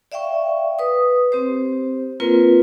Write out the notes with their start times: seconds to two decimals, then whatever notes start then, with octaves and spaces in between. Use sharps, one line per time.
0.12 D5 E5 F5 G5 C#6
0.79 B4 D#6
1.32 C4 G4 C5
2.20 A#3 C4 F4 A#4 B4